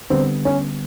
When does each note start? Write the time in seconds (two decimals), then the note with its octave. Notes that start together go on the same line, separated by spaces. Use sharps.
0.10 D3 G3 B3 C4
0.45 C#4